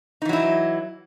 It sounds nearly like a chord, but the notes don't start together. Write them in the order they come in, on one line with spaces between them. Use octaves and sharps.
D#4 E3 F#3 E4